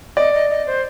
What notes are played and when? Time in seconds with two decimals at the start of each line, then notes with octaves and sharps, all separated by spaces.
0.17 D5 D#5
0.33 D#5
0.50 D#5
0.66 C5